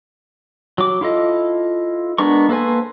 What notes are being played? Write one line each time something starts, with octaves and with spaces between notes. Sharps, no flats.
F#3 D6
E4 F4 A4 D#5
G#3 B3 D4 A#4 C#6
A#3 A4 B4 C5 G#5